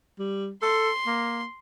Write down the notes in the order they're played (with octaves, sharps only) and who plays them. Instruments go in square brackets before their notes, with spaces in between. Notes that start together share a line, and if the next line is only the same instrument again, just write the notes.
[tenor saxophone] G3
[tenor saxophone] A4 [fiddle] C6
[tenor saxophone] A#3